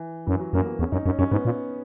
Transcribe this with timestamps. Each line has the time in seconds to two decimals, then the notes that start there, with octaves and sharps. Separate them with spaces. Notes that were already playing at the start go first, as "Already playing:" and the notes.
Already playing: E3
0.26 F#2 E3
0.40 F#3
0.53 F#2 A#3
0.66 B3
0.79 E2 C#4
0.92 F#2 D#4
1.05 F#2 C#4
1.19 F#2 C#4
1.31 G#2 B3
1.45 A#2